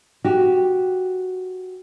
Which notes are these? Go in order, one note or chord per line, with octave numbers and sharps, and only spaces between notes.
F#4 G4